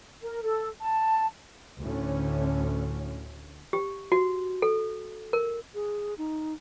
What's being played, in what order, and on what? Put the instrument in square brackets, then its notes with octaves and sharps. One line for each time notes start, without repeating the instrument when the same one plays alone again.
[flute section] A#4
A4
A5
[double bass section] D2 A2 D3 C#4
[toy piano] G4
F#4
A4
A#4
[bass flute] G#4
D#4